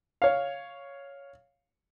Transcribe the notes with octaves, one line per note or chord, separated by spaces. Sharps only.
C#5 F5